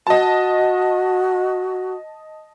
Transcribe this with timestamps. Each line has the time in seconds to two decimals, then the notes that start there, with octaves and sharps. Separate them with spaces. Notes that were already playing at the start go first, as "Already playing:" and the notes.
0.07 F#4 D#5 A5